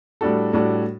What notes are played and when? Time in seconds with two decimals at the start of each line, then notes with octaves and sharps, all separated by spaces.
0.21 A2 G3 D4 F#4 A4
0.53 A2 G3 D4 F#4 A4